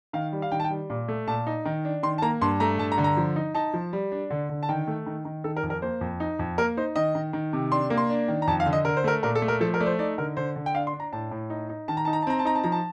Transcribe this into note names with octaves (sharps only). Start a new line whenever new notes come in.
D#3 F5
G3
F5
D#3 G5
A5
G5
G3
A#2
A3
A#2 A5
D#4
D#3
D4
D#3 C6
A5
A#3 A#5
G2 C6
A3 A#5
G2 A5
A#5
D3
A#5
F3
D#4
D#4 A5
F3
G3
D4
D3
D3
A5
D#3 G5
A3
D#3
D#3
D#3 A4
A#4
F2
A#4
A#3 C5
F2
D#4
F2
A#3 A#4
D#4 C5
D#3 D#5
D#3
D#3
C3
D4 C6
A#3
C6
D4
D#3
A#5
F2 A5
F5
D3
D#5
D3 A#4
C5
A3 A#4
A#2 A#4
A4
A3
A#4
F3 A4
A#4
A3 D5
C5
D#4 D5
D3 A#4
D3 C5
D3
G5
D4 F5
C6
D4
A#5
A2 A5
A2
D#4
D#4
D#3 A5
A#5
D#4 A5
A#5
A5
C4 A#5
A5
D#4 A#5
A5
F3 A#5
A5